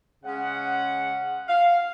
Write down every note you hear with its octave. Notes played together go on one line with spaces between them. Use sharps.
C#3 G#3 C#4 F#5
F5